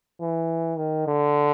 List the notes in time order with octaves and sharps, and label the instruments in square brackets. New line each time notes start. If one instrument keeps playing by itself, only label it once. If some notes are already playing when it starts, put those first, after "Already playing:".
[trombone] E3
D#3
D3